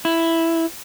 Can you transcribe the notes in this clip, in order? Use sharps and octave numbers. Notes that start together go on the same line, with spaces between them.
E4